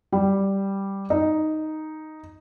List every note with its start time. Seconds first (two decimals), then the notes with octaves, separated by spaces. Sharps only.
0.12 G3
1.10 D#4